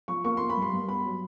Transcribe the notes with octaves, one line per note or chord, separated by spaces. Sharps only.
F3 C#6
A#3 C#6
A#3 C6
B5
G2
C6
G2
B3 B5
F#3